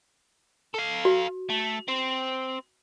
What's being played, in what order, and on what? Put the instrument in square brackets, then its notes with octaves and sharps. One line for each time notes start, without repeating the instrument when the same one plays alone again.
[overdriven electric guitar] A4 F5
[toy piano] F#4
[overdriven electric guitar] A3
C4